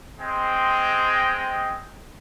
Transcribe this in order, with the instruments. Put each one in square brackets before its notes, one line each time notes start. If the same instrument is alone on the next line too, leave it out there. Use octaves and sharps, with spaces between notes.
[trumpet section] G#3 C4 C5 D#5 G5